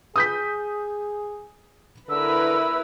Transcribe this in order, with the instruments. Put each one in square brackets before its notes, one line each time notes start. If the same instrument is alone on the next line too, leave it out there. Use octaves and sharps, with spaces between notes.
[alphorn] G#4 [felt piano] D#6 G6 B6
[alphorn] D3 [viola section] E4 A#4 B4 [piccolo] E6